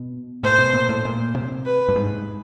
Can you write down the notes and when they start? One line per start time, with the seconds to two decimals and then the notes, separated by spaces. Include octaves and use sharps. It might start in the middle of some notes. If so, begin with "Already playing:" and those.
Already playing: B2
0.43 A2 C5
0.58 B2
0.74 A#2
0.89 A2
1.05 A#2
1.35 C3
1.66 B4
1.89 G2
1.96 G#2